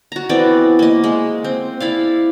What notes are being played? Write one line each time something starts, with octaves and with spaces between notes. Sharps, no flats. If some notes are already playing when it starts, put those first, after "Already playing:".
F#4 A#5
E3 B3 C4 D5
A#3 D#5
G#3
C4
E4 D5 F5